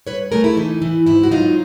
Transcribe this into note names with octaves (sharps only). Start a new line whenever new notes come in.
G2 B4 C#5
A3 G#4 A#4
E4
E3 D#4
E3 E4
G#2 E4
F#4
F#3 D#4 F4